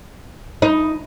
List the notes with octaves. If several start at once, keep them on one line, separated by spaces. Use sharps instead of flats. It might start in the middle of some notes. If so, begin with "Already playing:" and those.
D#4